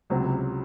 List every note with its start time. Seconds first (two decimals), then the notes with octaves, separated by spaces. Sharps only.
0.10 C#2 C3 F#3 C4